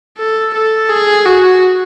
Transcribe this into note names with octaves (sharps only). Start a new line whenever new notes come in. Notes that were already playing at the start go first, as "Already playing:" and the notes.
A4
A4
G#4
F#4